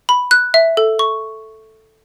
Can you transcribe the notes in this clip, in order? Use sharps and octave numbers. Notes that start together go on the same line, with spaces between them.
B5
F#6
E5
A4
C#6